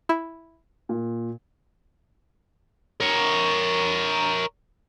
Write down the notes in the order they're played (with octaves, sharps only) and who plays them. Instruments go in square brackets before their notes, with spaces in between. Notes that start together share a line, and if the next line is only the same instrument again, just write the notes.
[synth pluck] E4
[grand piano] A#2
[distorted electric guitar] A#4 C#5